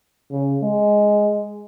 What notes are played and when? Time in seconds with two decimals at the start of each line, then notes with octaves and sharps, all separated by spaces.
0.31 C#3
0.62 G#3